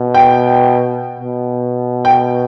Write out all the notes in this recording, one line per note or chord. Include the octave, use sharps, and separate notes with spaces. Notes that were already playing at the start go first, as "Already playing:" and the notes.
Already playing: B2
G5
B2
G5